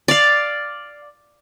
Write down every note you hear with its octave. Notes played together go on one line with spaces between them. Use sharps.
D5 F5